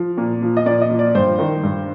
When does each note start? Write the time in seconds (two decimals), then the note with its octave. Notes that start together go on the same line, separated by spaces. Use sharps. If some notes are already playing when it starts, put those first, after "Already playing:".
Already playing: F3
0.18 A#2
0.42 F3
0.57 D#5
0.66 A#2 D5
0.82 D#5
0.90 F3
0.99 D5
1.15 G2 C5
1.39 D#3
1.64 G2